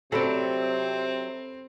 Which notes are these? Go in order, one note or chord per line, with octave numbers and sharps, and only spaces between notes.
C3 F#3 C4 D4 A4 B5